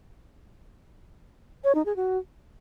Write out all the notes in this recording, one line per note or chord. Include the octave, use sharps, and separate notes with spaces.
C#5
D#4
G#4
F#4